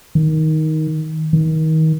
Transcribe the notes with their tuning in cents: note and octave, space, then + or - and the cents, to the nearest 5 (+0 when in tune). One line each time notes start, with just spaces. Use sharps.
D#3 +10
D#3 +30